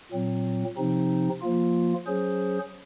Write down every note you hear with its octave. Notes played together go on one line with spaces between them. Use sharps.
A#2 F#3 C4
C3 F3 C4 D#4
F3 A#3 F4
F#3 C#4 G#4 C5